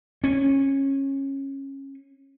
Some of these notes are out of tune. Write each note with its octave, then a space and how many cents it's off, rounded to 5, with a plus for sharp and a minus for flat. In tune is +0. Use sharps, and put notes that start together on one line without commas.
C#4 -20